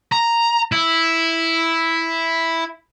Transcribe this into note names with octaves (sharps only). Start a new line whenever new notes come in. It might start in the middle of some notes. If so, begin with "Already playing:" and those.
A#5
E4